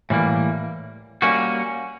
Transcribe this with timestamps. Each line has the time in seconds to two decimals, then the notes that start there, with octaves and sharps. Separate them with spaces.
0.10 A2 E3 G3 A#3
1.22 G3 A#3 C#4 F#4